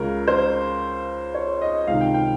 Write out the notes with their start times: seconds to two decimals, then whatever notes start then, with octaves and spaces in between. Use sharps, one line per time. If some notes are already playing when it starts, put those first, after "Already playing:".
Already playing: C#2 C#3 A#4
0.28 C5
1.34 C#5
1.61 D#5
1.87 C#2 C3 D#3 F5
2.01 G5
2.14 G5